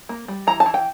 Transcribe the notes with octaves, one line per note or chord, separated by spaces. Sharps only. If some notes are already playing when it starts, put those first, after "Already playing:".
A#3
G3
E3 A#5
A5
E3
G5